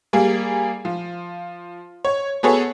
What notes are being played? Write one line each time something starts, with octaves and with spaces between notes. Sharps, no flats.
G3 A#3 G#4
F3
C#5
B3 F#4 G#4 A4 B4 C#5